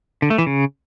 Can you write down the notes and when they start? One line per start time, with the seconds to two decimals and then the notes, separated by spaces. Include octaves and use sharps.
0.22 D3
0.30 A3
0.38 E3
0.46 C#3